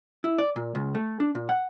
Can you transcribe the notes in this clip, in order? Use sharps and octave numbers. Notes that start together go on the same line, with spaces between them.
E4
D5
A#2
C#2
A3
D4
A#2
F#5